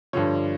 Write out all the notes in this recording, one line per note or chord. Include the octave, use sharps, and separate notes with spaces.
G2 D3 F3 C#5